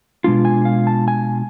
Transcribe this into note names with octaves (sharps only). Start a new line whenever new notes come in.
B2 G#3 D4 F4
G#5
F5
A5
G#5